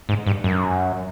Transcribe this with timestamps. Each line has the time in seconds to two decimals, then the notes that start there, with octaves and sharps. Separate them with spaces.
0.09 G#2
0.27 G2
0.44 F#2